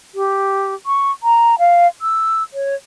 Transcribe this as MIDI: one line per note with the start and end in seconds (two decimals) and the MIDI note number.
0.15 0.74 67
0.86 1.11 85
1.23 1.55 82
1.59 1.87 77
2.02 2.43 88
2.54 2.75 73